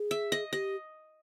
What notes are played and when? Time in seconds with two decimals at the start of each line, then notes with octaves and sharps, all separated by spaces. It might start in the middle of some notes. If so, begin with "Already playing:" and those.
Already playing: G#4
0.11 E5
0.32 D#5
0.52 G4 D#5